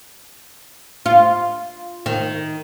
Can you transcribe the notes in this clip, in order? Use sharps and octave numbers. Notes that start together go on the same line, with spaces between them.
F4
D#3